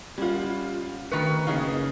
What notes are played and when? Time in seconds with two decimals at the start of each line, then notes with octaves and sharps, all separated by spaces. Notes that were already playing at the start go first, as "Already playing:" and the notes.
0.18 G3 C#4 F4 F#5
1.12 D2 D#3 B4 C#6 C#7
1.47 F#1 C#3 D#4 G#4 F5